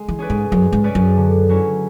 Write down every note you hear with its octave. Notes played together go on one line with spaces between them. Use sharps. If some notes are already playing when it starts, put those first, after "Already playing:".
Already playing: G#3
E3
C#4 G#4 B4 D5
G#2
F#2 G#3
G#2
C#4 G#4 B4 D5
F#2
D3
F#3 C#4 E4